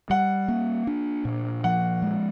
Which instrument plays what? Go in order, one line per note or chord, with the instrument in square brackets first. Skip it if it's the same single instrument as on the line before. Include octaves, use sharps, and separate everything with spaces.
[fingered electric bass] G3 [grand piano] F#5
[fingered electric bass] A#3
D4
A#2
[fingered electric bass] F3 [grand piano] F#5
[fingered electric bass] G#3